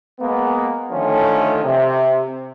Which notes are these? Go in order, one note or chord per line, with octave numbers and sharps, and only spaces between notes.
G#3 A#3 B3
D3 D#3 F3 A3 C#4
C3